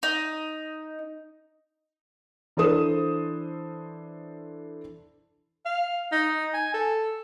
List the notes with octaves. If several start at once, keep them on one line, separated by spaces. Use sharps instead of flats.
D#4
E3 D4 A4 C5 D#6 E7
F5
D#4
G#5
A4